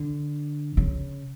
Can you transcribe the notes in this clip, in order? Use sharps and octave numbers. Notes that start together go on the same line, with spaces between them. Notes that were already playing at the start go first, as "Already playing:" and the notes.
Already playing: D3
C#3